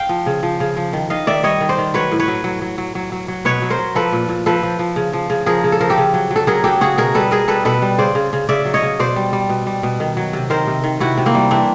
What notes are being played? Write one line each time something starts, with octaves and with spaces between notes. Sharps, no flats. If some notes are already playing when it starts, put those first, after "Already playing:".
Already playing: F5 G5
F3
C#3
F3
C#3
F3
D#3
D#3 D#5 F5
D#3 D5 E5
G3 C#5 D#5
D#3
C5 D5
D#3
F#3 B4 C#5
A2
B4 C#5
F#3
F#3
F#3
F#3
F#3
F#3
F#3
B2 B4 C#5
F#3
A#4 C5
F#3
F3 A4 B4
A#2
A#2
F3 A4 B4
F3
F3
C#3
F3
C#3
F3 G#4 A#4
C#3
A4
F3 A#4
G4 A4
C#3
F#3
F#3
A4
F#3 G#4 A#4
F#3 G4 A4
C#3 F#4 G#4
B2 G#4 A#4
G3 A4 B4
B2 G#4 A#4
G3 A4 B4
B2 A4 B4
G3
C#3 C5 D5
C#3
C#3
C#3 D5 E5
F#3
C#5 D#5
C#3
B2 C5 D5
G3
G3
B2
G3
B2
D#3
F#3
C3
D#3 A#4 C5
C3
D#3
C3 E4 F#4
C3
A#3 C4
G3
E3 C4 D4